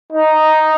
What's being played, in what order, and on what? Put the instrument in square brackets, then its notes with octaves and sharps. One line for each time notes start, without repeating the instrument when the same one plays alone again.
[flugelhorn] D#4